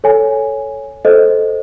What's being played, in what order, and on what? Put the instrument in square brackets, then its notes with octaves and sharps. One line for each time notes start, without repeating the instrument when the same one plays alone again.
[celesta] A4 C#5 G#5
A4 C5 D#5